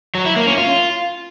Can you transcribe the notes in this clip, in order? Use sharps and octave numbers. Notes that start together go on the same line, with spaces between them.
F#3
E4
A#3
C#4
F4